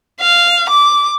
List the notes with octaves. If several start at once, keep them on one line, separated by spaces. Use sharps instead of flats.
F5
D6